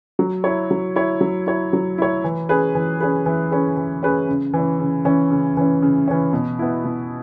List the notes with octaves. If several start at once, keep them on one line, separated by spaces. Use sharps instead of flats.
F#3
E4 C#5
F#3
E4 C#5
F#3
E4 C#5
F#3
E4 C#5
E3
C#4 G#4 B4
E3
C#4 G#4 B4
E3
C#4 G#4 B4
E3
C#4 G#4 B4
C#3
E3 C#4
C#3
E3 C#4
C#3
E3 C#4
C#3
E3 C#4
B2
B3 E4
B2